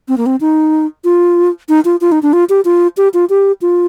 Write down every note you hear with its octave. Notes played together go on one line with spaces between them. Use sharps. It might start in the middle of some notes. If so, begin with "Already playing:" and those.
C4
A#3
C4
D#4
F4
D#4
F4
F4
D#4
D4
F4
G4
F4
G4
F4
G4
F4